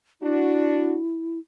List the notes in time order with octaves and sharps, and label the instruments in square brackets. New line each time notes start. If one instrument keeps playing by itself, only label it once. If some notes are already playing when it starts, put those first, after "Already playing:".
[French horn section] D4 F#4 [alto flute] E4